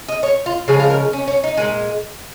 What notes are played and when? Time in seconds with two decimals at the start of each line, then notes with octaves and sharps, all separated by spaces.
0.08 D#5
0.23 C#5
0.46 F4
0.68 C#3 F3 G#3 G#4
0.79 F4
0.90 A#4
1.13 C#4
1.28 C#4
1.44 D#4
1.58 A#2 G#3